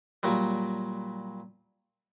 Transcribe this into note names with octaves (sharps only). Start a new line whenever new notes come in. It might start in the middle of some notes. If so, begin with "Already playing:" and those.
A#2 F#3 G3